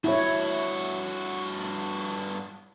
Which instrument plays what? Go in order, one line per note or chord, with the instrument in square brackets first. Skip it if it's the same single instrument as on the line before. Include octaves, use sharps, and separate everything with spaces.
[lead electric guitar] G2 F#4 [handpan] E4 C#5